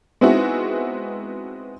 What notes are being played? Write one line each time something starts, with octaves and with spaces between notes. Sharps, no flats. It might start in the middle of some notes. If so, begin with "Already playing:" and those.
G#3 B3 C4 D#4 E4 F#4